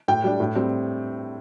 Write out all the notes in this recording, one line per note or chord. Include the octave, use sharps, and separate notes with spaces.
A2 G5
G3 D4
A2
G3 C4